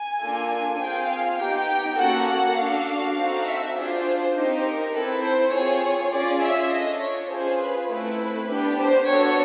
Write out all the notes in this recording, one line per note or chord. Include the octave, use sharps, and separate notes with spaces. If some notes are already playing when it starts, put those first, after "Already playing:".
Already playing: G#5
A#3 D4 F4 A4
C4 F4 G#4 G5
F5
B3 D#4 G4 G5
A#3 C#4 F#4 A4 F#5
F#5
D4 F#4 A4 F5
C4 D#4 F#4 A4
E5
D4 F4 G#4 C5
C4 D#4 G4
A#4
C4 E4 A4 B4
C5
C4 F4 G#4 C#5
C#4 F4 G#4 D5
E5
D4 F4 A4 D#5
C#5
C#4 F4 G#4 C5
B4
A3 C4 E4 B4
B3 D4 G4
C5
B3 D4 F#4 A4 C#5